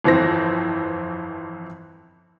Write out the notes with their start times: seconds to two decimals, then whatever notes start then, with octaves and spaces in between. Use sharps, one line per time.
0.04 G1 F2 E3 C4 A#6